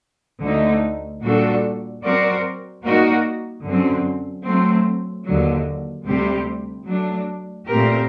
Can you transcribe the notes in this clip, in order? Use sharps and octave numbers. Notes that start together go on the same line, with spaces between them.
D2 D3 A3 D#4
A#2 G3 D4 F#4 A4
F#3 C4 F#4 A#4 D5
G3 A#3 D#4 F#4 A#4
F#2 D3 F#3 C4
F#3 A3 C4
D#2 D3 F#3
D2 C3 G3 C4 G4
F#3 A3 D4
A#2 A3 C4 G4 A#4